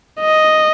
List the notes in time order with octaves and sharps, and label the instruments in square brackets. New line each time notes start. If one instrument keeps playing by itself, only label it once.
[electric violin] D#5